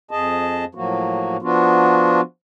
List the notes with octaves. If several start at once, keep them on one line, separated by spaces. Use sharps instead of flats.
F2 G#4 D#5 A5
A2 F3 F#3 A#3 F#4
F3 B3 D4 F4 F#4